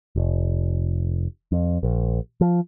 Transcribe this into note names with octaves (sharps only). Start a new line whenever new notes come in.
F1
F2
A#1
F3